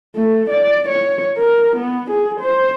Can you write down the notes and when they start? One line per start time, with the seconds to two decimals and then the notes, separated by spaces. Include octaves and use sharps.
0.15 A3
0.50 D5
0.89 C#5
1.37 A#4
1.77 B3
2.11 G#4
2.41 C5